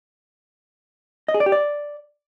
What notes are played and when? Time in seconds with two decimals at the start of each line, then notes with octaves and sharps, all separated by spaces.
1.28 D#5
1.34 G#4
1.40 D5
1.46 G4
1.52 D5